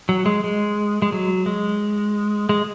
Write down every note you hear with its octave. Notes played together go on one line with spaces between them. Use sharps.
F#3
G#3
G#3
G#3
F#3
G#3
G#3